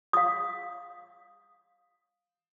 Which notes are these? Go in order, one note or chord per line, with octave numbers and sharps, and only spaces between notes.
F5 D#6